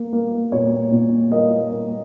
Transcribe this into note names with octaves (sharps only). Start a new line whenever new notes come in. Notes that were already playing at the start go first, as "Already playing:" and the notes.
Already playing: A#3
A#3
A#2 C#5
A#2
A#3 D#5
A#3